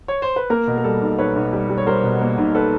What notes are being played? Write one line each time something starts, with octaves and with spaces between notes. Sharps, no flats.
C#5
C5
B4
A#3 A#4
B2
A#4
G3 A4
B1
B1 B4 C#5
B1
G3
G3
C#5
G3 A#4 C5
B2
A#3
B1
A4 B4